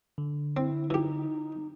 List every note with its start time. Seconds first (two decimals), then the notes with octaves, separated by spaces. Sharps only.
0.18 D3
0.57 C4 E4
0.90 E3 D#4 G4